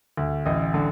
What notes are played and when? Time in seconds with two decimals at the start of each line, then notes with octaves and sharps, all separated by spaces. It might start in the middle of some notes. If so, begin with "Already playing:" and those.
0.17 D2
0.46 A1 D#5
0.74 D3